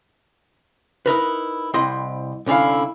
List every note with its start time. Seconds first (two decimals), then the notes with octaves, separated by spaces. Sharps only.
1.06 D#4 E4 A#4 B4
1.74 C2 C4 E4 D#5 C6
2.46 C2 D3 C#4 E4 F5